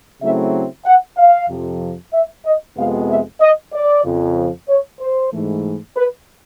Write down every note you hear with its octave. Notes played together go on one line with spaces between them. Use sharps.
C#3 F#3 A3 C4 E4 E5
F#5
F5
F2 C3 F3
E5
D#5
F2 C3 F3 G#3 B3 F5
E5
D#5
D5
F2 C#3 F3
C#5
C5
G#2 E3 A3
B4